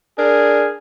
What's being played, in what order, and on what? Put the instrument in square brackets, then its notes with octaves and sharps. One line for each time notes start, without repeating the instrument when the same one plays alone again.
[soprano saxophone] D4 [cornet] G#4 [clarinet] A#4